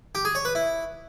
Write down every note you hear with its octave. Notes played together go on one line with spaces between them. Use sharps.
G4
G#4
C#5
B4
E4